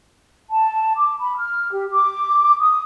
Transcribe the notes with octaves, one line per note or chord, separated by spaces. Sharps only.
A5
D6
B5
F6
G4
D6
D#6